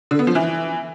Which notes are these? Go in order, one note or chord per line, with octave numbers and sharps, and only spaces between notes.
D3
B3
F3
E3